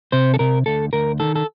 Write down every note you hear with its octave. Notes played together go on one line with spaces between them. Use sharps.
C3 C5
A4
C3 A#4
D2 A4
D2 A#4
D#3 A4
A4